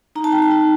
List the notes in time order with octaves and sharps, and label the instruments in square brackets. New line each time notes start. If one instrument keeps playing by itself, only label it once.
[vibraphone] D#4 A#5
A5
G5
A5
D#4